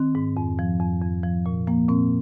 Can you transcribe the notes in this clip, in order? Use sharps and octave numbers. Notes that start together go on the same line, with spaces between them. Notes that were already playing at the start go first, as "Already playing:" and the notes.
Already playing: D#3 C4
G#2
F2
F3
F2
F2
F3
A#2
F3 A#3
A#2 C4